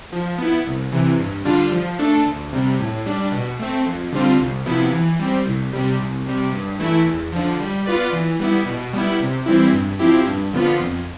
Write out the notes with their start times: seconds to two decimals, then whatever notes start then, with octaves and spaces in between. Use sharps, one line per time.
0.12 F3
0.38 B3 E4
0.66 C2
0.92 C3 E3
1.19 G2
1.45 D3 G3 D4 F4
1.72 F3
1.99 A3 D4 A4
2.26 D2
2.53 C3 G3
2.79 A2
3.06 G3 D4
3.32 B2
3.59 A3 C4
3.86 F2
4.12 D3 G3 C4 F4
4.39 C2
4.66 C3 F3 B3 E4
4.92 E3
5.19 G3 C4
5.46 C2
5.73 C3 G3
5.99 C2
6.26 C3 G3
6.53 G2
6.79 E3 A3 E4
7.06 E2
7.32 D3 F3
7.60 G3
7.86 B3 F4 B4 D5
8.12 E3
8.39 G3 B3 E4
8.66 B2
8.93 G3 B3 E4
9.20 C3
9.46 E3 G3 C4 E4
9.72 G2
9.99 F3 C4 E4 G4
10.27 G2
10.53 D3 F3 B3 F4
10.79 F2